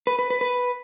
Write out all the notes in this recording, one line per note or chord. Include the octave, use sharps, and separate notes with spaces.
B4
B4
B4
B4